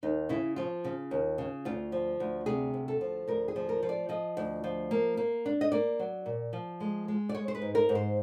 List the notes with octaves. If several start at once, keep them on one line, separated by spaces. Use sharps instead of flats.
D#2 D#4
C#3 E4
F3 F4
C#3
D#2
C#3
D2 F4
F3
D2
C3 G#4
D2
A4
F3
D2 A#4
G#4
F3
A#4
F3
D5
F3 D#5
D2
F3
A#3
A#3
D4
D#5
A#3 D5
F#3
A#2
F3
G#3
G#3
D5
G#3 C#5
C5
B4
G#2
A#4
G#2
C5